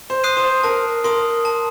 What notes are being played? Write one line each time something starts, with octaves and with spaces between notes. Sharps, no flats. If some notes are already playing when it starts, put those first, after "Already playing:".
C5
D#6 F#6 C7 D#7
C5
A#4 A5
A#4 C6 D#6
A5